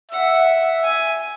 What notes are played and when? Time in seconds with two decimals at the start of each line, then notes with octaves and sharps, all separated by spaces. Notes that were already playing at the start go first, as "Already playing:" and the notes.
0.11 E5 F#5
0.83 G#5